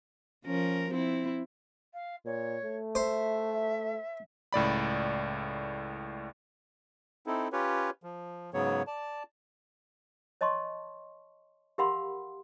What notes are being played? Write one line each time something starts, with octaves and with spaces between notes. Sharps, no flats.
F3 C#4 A#4
C4 E4
F5
A#2 C#5
A3
C5 E5
C#2 A2 D5 B5
C4 D#4 E4 A4
C#4 F4 G4 B4 C#5
F3
G#2 C#3 F#3 B3 C#5
D5 A5
C#5 D#5 A5 C6 C#6
G4 A#4 F5 F#5 B5 C6